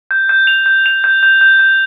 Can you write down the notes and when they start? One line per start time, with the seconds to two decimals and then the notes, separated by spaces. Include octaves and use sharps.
0.11 G6
0.29 G6
0.47 F7
0.66 G6
0.86 F7
1.04 G6
1.23 G6
1.41 G6
1.59 G6